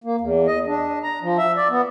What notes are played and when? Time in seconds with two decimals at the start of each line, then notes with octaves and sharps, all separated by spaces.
0.04 A#3
0.21 E2
0.47 D#5
0.67 D4
1.03 A#5
1.22 F3
1.38 E5
1.57 D5
1.70 B3